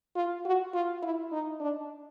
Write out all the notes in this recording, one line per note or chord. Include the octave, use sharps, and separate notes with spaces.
F4
F#4
F4
E4
D#4
D4